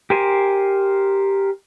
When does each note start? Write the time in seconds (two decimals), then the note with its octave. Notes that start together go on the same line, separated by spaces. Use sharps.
0.10 G4 A#4 C5 G#5